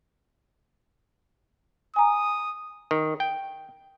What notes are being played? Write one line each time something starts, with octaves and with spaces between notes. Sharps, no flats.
G#5 A#5 D#6
D#3
G5